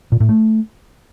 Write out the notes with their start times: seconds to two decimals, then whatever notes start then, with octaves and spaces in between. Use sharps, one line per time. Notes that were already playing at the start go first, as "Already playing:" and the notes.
0.12 A#2
0.20 A2
0.29 A3